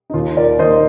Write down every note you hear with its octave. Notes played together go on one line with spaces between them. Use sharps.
D#4
D#2 F4
A#4 D5
D#3 A#3 C5 D#5